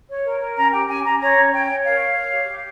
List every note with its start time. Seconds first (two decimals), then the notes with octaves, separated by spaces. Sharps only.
0.09 C#5
0.25 A#4
0.40 A#4
0.56 C#4 A#5
0.72 G4 G5
0.88 C#4 G#5
1.04 C#4 A#5
1.20 C#5 A#5
1.36 C#4
1.52 C#5 G5
1.68 C#5
1.84 A#4 F5
2.00 C#5
2.15 C#5
2.32 G4
2.48 G4